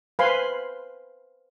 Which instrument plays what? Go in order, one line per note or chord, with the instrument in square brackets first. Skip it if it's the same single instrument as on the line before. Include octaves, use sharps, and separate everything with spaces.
[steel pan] B4 C5 F5 G#5 B5 C6